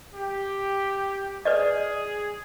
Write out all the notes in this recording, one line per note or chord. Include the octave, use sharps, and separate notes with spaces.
G4
G#4 B4 D5 D#5